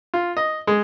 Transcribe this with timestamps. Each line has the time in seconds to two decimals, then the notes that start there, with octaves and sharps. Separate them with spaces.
0.14 F4
0.37 D#5
0.67 G#3